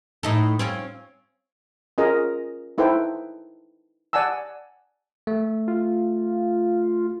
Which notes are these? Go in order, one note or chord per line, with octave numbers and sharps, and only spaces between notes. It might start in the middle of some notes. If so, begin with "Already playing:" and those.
A2 D#4 A4
C4 C#4 F4
C#4 F4 G#4 A#4 D#5
D#4 E4 A4 B4 C5 G5
D5 F#5 G#5 A5 E6
A3
F4